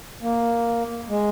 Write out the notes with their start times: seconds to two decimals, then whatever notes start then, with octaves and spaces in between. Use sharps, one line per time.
0.22 A#3
1.09 G#3